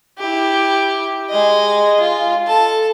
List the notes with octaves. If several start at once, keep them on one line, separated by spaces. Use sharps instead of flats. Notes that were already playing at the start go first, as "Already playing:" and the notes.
E4 G4
G#3 D#5
F4
A4 A5